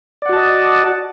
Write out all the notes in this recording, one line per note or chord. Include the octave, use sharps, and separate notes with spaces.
F#4 D5 D#5 F#5 A5